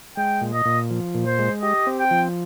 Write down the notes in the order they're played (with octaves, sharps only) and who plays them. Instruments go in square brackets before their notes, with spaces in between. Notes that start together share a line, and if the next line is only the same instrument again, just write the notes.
[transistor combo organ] G#3 [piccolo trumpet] G5
[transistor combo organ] A#2
[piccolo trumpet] D#5
[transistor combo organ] A#2
F3
A#2
[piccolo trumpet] C5
[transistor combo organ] G#3
[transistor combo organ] G4 [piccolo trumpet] D#5
[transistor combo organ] C4
[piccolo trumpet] G5
[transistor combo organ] F3